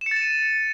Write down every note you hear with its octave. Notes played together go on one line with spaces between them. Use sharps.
E7
C#7
A6
E7
D#7